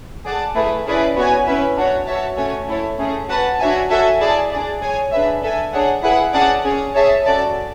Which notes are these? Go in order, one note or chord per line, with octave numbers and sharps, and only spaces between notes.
G#4 D5 F#5 A5
A3 E4 G#4 B4
C#4 E4 G#4 B4 D5
B3 F#4 C#5 G#5
C#4 E4 B4 E5
D4 F#4 C#5
F#4 C#5 E5 A5
A3 C#4 F#4 C#5 G#5
A3 E4 A4 C#5
A3 C#4 G#4
F#4 B4 F#5 A5
D4 F#4 C#5 E5 G#5
F#4 A4 E5 G#5
E4 G#4 D5 A5
D4 G#4 D5
G#4 C#5 G#5
D4 G#4 B4 E5
D4 A4 E5 G#5
D4 G#4 C#5 F#5
E4 G#4 B4 F#5
C#4 G#4 D5 F#5 A5
C#4 G#4 C#5
G#4 C#5 E5 A5
C#4 F#4 A4 D5 A5